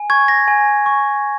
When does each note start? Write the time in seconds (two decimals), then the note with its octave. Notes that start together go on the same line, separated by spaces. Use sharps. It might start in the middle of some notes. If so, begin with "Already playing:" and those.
Already playing: G#5
0.10 C#6 G#6
0.28 A#6
0.48 G#5
0.86 C#6